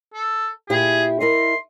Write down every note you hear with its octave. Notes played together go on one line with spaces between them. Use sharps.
A4
A#2 E4 G4 G#4
E4 A#4 D#5 C6